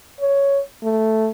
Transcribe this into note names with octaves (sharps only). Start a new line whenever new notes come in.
C#5
A3